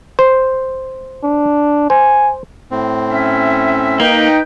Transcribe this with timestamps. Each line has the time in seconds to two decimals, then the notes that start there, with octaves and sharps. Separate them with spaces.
0.19 C5
1.24 D4
1.90 C5 G#5
2.71 A2 C4
3.10 C#4 E5
4.00 A#3 D#4 B4 G5